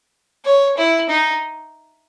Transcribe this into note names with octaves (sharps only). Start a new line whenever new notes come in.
C#5
E4
D#4